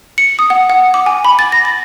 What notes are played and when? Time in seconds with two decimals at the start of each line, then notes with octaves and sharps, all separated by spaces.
0.18 C#7
0.39 D#6
0.50 F#5
0.70 F#5
0.94 D6
1.06 G#5
1.25 B5
1.39 A6
1.52 A#6
1.65 A6